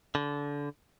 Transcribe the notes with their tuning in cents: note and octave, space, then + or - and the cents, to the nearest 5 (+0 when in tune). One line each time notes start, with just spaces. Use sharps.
D3 -25